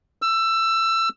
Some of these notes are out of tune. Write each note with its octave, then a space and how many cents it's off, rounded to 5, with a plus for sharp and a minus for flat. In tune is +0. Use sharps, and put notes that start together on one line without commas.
E6 +20